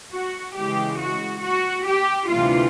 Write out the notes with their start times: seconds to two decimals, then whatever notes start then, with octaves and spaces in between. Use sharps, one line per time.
0.12 F#4
0.56 C#3 E3 G#3 G4
0.99 F#4
1.42 F#4
1.87 G4
2.30 D2 C3 E3 G3 F4